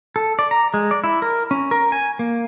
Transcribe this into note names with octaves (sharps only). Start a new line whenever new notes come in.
A4
D5
A#5
G#3
D5
E4
A#4
C#4
A#4
G#5
A#3